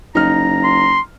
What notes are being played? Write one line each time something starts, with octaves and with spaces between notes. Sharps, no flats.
F#1 D#4 A#5 F6
C6